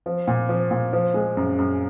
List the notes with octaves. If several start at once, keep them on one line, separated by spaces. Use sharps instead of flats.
F3
A#2
F3
A#2
F3
G#3
F#2
F#2